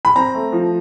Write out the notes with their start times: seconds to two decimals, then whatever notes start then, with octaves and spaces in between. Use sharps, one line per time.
0.05 B5
0.16 C4 A#5
0.34 A3
0.52 F3